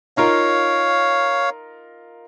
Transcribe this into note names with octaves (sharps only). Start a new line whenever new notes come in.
D#4 F4 A#4 C#5 F5